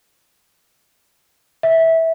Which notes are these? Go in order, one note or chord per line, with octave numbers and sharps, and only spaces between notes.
E5